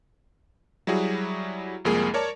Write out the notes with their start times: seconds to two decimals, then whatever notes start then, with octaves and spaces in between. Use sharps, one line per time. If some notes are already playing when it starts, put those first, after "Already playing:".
0.87 F#3 G3 E4 F#4 G#4
1.85 C2 F2 G#3 A#3 G#4
2.14 A#4 C#5 D5 A5